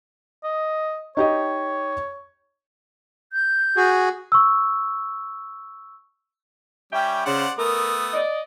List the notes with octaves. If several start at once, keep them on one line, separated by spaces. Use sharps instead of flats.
D#5
D#4 G4 C#5 D#5
G6
F#4 G#4
C#6 E6
G3 C#4 E5 G5
C#3 C5 D5 F#5
A3 B3 A#4 D#6
D5 D#5